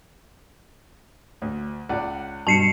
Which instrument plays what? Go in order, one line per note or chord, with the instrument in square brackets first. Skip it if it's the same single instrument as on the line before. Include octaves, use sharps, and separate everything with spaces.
[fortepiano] D2
C#2 D5 F#5
[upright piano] G2 [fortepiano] B2 [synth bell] A5 C7 C#7